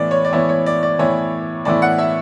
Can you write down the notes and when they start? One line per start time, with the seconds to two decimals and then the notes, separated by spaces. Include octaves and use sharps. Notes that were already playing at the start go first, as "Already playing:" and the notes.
Already playing: A2 E3 B3 E4 D5
0.11 C#5
0.25 D5
0.33 A2 E3 B3 E4 C#5
0.49 C#5
0.66 D5
0.83 D5
0.99 A2 E3 B3 E4 C#5
1.65 A2 E3 B3 E4 D5
1.82 F#5
1.98 E5